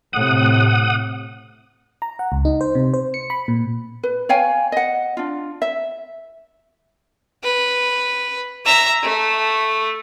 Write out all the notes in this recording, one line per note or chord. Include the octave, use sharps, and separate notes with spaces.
A2 C3 F#5 D#6
A#5
F#5
C#2
D#4
C5
C3
C5
C#7
B5
A#2
B4
C#5 F5 G5 G#5
D#5 F#5
D4 F4
E5
B4
E5 A#5
A3